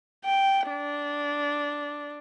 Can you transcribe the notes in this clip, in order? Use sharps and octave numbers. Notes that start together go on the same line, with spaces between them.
G5
D4